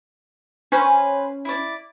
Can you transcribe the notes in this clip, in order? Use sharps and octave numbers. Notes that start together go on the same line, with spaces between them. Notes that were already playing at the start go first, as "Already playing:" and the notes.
C#4 B4 C5 G#5
E4 D5